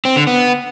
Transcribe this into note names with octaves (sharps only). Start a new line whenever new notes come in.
C4
D3
B3